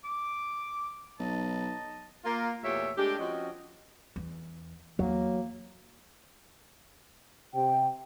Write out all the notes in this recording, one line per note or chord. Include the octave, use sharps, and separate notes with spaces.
D6
B1 D#4 D#5 A5
A#3 F4
E2 A#2 A3 G4 C#5 E5
G#3 A3 D4 G4
F3 C4 C#4 F#4 D#5
E2
E2 F#3 A#3
C3 G5